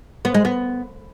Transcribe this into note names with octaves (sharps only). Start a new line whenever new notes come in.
B3
G#3
B3